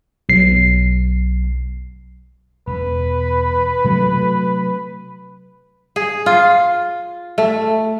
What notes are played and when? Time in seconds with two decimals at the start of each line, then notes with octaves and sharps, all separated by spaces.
0.29 B1 C7
2.67 E1 B4
3.84 C3 F#3 A3
5.96 G#4
6.26 F4
7.38 A3